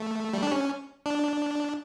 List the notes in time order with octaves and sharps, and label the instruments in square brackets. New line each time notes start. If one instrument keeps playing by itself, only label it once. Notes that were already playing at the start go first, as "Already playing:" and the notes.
Already playing: [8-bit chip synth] A3
G3
D4
C#4
D4